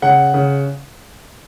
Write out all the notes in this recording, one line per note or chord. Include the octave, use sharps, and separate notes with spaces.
C#3 F#5
C#3